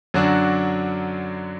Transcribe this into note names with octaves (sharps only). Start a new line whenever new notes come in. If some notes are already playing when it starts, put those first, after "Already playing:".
F#2 D3 F#3 D4 F#4